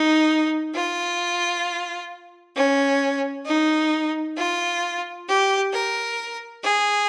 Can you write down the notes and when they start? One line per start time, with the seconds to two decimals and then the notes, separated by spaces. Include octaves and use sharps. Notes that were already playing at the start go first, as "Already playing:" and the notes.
Already playing: D#4
0.74 F4
2.56 C#4
3.46 D#4
4.37 F4
5.28 G4
5.73 A#4
6.63 G#4